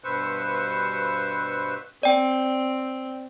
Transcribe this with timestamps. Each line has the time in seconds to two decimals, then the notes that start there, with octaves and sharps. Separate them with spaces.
0.04 G2 B2 B4 C5 C#6 E6
2.03 C4 D5 G5